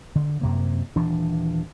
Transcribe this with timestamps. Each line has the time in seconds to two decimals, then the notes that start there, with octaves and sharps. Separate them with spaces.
0.15 D3
0.41 F#2 C3 A#3
0.96 D#1 E3 D4